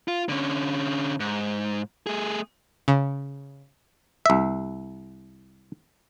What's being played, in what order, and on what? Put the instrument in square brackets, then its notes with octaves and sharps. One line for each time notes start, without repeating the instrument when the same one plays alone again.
[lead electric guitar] F4
D3 C#4
G#2
A3 G#4
[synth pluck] C#3
[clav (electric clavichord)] C2 E5